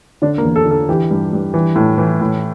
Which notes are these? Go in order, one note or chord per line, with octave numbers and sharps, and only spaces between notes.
D3 D4
A#3
E2
A4
D3
A4
E3 G4
G2
G2
E3
A2
E3
A2